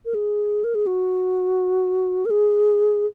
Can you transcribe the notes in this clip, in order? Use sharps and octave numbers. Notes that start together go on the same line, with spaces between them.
A#4
G#4
A#4
G#4
F#4
A#4
G#4